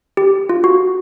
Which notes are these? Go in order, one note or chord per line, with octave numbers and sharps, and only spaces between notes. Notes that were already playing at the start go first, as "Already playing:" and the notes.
G4
F4
F#4